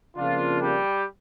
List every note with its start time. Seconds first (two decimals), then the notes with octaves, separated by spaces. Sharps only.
0.16 F2 C#3 F3 A#3 D4 F4
0.60 G3 G4